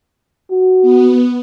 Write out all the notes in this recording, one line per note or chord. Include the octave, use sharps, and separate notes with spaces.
F#4
B3